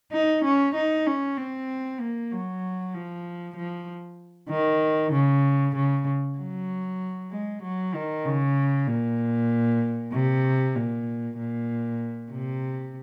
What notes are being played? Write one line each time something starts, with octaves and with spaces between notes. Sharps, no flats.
D#4
C#4
D#4
C#4
C4
A#3
F#3
F3
F3
D#3
C#3
C#3
F#3
G#3
F#3
D#3
C#3
A#2
C3
A#2
A#2
C3